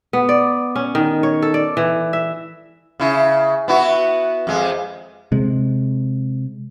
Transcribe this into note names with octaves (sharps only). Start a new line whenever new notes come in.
B3
D5
C#4
D#3
C#5
A4
D5
E3
E5
C#3 E4
B3 E4 F#4
F2 G#3
C3 G#3